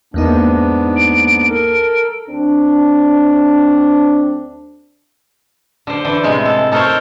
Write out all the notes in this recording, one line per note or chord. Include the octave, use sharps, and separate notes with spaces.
E2 G#2 A#3 B3 D4 D#4
D7
A4 A#4
D2 C4 D4
D3 C5
D3 E3
A2 C3 G#3
A4
D#4 A4 A#4 C5 C#5